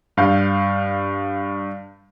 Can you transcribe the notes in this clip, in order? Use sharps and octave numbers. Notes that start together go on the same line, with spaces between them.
G2 F5 G6